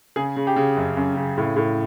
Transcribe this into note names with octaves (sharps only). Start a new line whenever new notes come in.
C#3 G#4
C#3
G4
C#3
F#2
F#2
C#3
A2
A2